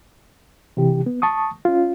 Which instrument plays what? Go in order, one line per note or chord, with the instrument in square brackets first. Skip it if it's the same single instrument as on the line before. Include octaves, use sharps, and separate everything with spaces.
[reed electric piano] C3 E3 G4
B3
A5 C#6 D#6
C#4 F4